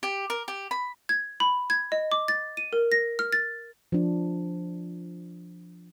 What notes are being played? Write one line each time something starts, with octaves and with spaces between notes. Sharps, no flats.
G4
A#4
G4
B5
G#6
B5
G#6
D#5
D6
A6
D#7
A#4
A#6
F6
A6
F3 D4